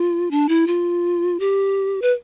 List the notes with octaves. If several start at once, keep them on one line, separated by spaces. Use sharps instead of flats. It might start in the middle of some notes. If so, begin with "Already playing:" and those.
Already playing: F4
D4
E4
F4
G4
B4